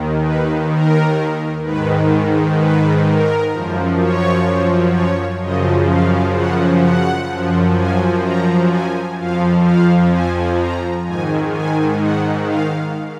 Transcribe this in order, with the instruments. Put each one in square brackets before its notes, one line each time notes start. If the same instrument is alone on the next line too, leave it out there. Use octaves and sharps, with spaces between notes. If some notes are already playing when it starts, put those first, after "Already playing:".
Already playing: [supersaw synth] D#2 D#3
B4
A#4
G#2 D#3 B4
B4
A#4
F#2 F3
C#5
C#5
F#2 C#3 F3 D#5
F5
F#5
F#5
F#2 F3
G#5
A#5
G#5
F2 F3 F5
F5
G#5
A#5
G#2 D#3 G#5
G#5
F#5
F5